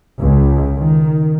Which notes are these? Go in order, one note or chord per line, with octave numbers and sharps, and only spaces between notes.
C#2
D#3